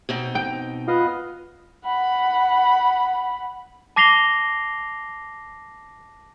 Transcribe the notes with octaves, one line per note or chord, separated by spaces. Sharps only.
B2 C4 D#4
G5
B3 F4 D#5 F5
F#5 B5
A5 D6 A#6 C7 F7 G7